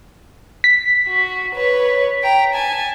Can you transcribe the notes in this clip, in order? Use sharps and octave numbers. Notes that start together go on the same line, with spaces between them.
B6
F#4
B4 C#5
G5 A#5
G#5 A5